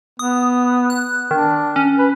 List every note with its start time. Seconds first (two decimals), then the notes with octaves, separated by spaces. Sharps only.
0.19 B3 D#6
0.90 F#6
1.31 D#3 D4
1.76 C#4
1.98 B4